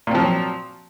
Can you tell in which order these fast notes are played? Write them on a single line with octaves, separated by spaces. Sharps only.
A#2 C4 F3 F#3